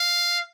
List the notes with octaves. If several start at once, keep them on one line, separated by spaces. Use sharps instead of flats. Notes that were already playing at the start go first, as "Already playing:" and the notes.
Already playing: F5